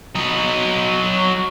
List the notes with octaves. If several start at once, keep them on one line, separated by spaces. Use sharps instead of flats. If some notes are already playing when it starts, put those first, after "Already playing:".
F#3 D#5